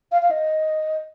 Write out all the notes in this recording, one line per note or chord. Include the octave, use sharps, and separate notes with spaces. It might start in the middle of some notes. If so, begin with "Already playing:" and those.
F5
F5
D#5